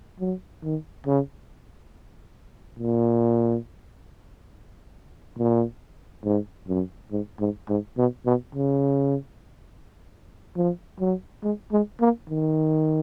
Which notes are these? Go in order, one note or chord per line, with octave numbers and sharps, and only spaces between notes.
F#3
D#3
C#3
A#2
A#2
G#2
F#2
G#2
G#2
G#2
B2
B2
C#3
F3
F#3
G#3
G#3
A#3
D#3